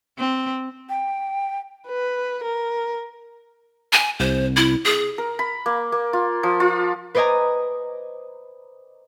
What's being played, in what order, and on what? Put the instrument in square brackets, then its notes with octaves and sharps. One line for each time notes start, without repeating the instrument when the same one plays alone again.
[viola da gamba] C4
[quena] G5
[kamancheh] B4
A#4
[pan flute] G#5
[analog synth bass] C2 [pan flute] C5
[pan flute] E4
G#4
[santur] A#4
B5
A#3
A#3
F4
F3
F4
[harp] B4 C5 D5 D#5 G#5 A#5